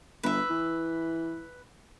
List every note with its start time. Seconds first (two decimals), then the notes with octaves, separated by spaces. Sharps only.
0.23 G1 B4 E5
0.50 E3